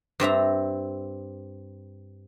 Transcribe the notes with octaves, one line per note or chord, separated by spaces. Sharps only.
G2 C4 E5 A#5